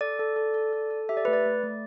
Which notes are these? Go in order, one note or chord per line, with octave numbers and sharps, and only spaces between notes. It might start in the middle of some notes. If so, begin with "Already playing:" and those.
A4 D5
A4
A4
A4
A4
A4
G4 E5
D5
A3 B4
D5
A3
A3